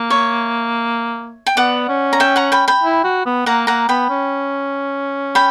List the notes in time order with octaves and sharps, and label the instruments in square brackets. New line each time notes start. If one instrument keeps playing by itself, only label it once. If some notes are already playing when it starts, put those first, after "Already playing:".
Already playing: [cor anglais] A#3
[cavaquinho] C#5 E5
G5
[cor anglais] B3 [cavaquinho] D5 F#5
[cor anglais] C#4
[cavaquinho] A#5
E5 G5
F#5 A#5
G5 B5
G5 B5
[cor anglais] E4
F#4
B3
[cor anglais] A#3 [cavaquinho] F#5 A#5
[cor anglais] A#3 [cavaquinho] F#5 A#5
[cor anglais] B3 [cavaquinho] G5 B5
[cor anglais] C#4
[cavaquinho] G5 B5